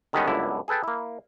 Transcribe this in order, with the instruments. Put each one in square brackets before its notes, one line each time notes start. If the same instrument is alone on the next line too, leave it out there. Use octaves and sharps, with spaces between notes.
[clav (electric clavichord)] D3 D#3 G3 G#3 B3 C#4
G1 C#2 F#2 D3 E4
G#4 A4 B4 G5 A5
A#3 E4